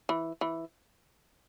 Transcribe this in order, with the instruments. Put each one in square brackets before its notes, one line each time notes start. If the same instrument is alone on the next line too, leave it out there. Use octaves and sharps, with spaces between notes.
[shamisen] E3
E3